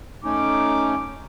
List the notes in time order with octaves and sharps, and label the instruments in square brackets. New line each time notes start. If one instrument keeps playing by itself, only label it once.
[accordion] A3 C#4 D#4 [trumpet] D6